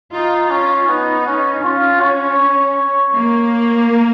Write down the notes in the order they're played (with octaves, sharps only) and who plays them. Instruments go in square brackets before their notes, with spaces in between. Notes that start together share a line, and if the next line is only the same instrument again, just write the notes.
[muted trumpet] D#4 [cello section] F4
[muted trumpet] C#4 [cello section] F4
[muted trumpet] B3 [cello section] D#4
[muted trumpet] C#4
[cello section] C#4 [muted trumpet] F4
[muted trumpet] C#5
[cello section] A#3